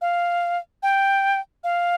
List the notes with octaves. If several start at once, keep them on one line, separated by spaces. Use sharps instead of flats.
F5
G5
F5